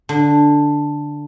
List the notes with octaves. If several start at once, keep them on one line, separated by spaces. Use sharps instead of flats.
D3